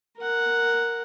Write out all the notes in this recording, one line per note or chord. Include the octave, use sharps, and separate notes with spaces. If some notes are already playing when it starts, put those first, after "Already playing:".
A#4 F#5